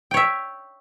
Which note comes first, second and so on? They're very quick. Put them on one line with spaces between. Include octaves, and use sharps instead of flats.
G5 C#5 E5